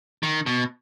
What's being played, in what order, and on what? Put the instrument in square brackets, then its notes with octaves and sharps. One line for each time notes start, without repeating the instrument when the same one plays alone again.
[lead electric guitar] D#3
B2